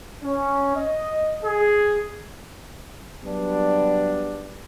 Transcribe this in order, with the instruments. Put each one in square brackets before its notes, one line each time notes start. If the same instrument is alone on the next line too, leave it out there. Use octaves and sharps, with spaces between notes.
[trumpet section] C#4
D#5
G#4
[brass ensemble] F#3 G3 B3 D4